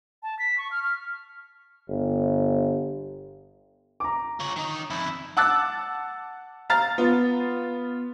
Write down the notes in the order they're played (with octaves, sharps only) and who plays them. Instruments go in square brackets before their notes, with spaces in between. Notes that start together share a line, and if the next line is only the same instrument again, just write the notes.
[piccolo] A5
B6
C#6
F6
F6
[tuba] G1
[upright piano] A#5 D6
[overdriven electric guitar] F4 C#5
D#3 D#4
F2 E4
[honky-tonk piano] F#5 A5 D6 E6 F#6 A6
F5 A#5 F6 A6
B3 F4